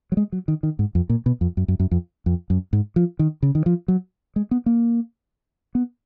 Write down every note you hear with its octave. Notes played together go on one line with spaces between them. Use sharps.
F#3
G#3
F#3
D#3
D#3
G#2
F2
A#2
B2
F2
F#2
F#2
F#2
F2
F2
F#2
G#2
F3
D#3
C#3
D#3
F3
F#3
G#3
B3
A#3
B3